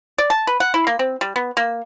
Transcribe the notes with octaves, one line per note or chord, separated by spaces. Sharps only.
D5
A5
B4
F#5
E4
A#3
C4
G3
B3
A#3